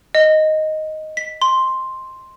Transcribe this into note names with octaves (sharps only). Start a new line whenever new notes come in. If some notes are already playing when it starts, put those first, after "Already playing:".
D#5
B6
C6